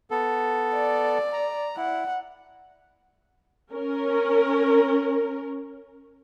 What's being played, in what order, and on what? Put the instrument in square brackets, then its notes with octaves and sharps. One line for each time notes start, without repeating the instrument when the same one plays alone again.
[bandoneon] B3 A4
[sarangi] D5
[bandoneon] A#5
[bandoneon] E4 [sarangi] F#5
[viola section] C#4 A#4